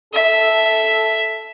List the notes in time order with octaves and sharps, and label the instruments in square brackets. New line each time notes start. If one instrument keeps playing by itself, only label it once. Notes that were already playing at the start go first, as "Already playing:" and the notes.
[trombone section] A4 [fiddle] E5